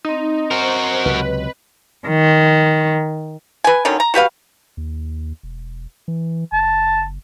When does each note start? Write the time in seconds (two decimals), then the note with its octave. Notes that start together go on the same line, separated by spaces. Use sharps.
0.05 C4 D#4 D#5
0.51 F#4 A#4 C5
1.05 C#2 C3 F#3 B4
2.07 D#3
3.64 B4 G#5
3.85 D3 D#3 F#3 C#4
4.00 A#5
4.14 F#4 G4 B4 F5
4.77 D#2
5.43 E1
6.08 E3
6.52 F#1 A5